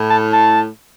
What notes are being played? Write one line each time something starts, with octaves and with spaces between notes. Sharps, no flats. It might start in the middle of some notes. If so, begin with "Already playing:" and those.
Already playing: A2
A5
A5